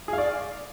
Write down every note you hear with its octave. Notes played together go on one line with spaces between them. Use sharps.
G#4
F5
D5